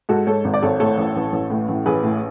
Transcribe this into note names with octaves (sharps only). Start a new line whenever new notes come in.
G#2 F#4 A4
G#2 A4 C#5
G#1
D5
G#1 A4 C#5
A2 A4 C#5
A1
A1
A1
A2
A1
A1 G#4 B4
A2